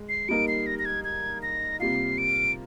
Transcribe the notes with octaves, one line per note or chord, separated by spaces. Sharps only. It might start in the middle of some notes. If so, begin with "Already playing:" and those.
Already playing: G#3
C7
G3 A#3 D#4 A#4 D7
C7
A#6
A#6
G#6
G#6
A#6
C3 G3 A#3 F4 C7
D7